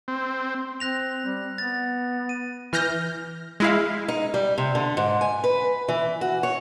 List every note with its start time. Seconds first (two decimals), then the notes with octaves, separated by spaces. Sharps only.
0.08 C4
0.80 C4 F#6 A#6 F7
1.26 G3
1.58 B3 A6
2.29 D#7
2.73 E3 F6 G6 A#6
3.60 G#3 E4 F5
4.08 D#4
4.34 G3
4.58 C3
4.75 D3
4.97 G#2
5.21 G#5
5.44 B4
5.88 E3
6.21 F#4
6.43 C#5